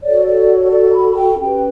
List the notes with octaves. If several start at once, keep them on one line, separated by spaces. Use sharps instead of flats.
F#4 A4 C#5 D5
D5
C#5
D5
B5
G5
C#4 G4 B4 G5